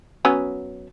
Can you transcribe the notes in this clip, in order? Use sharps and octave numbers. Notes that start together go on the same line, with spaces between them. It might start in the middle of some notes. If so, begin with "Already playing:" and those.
F#3 B3 C#4